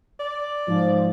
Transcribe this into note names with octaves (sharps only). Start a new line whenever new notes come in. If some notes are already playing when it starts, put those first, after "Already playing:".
D5
G#2 F3